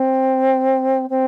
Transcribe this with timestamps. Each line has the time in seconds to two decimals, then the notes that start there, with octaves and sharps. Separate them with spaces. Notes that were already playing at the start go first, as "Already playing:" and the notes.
Already playing: C4
1.10 C4